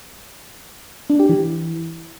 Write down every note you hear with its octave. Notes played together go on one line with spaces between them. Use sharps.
D4
G4
E3